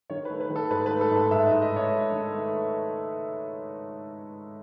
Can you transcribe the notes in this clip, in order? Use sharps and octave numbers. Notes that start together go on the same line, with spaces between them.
D#3 C#5
B4
A3
B4
D#3
A4
G#2 B4
B4
A3
A4
G#2 A4
G#2 E5
D#5
G#2
D#5
G#2 C#5
A3
D#3
A3